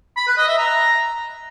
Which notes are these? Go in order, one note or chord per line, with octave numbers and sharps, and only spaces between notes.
B5
B4
D#5
E5
A#5